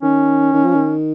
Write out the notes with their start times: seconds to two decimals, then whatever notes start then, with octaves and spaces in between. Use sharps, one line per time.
0.02 D#3 C#4
0.54 D#3
0.65 F3
0.75 D#3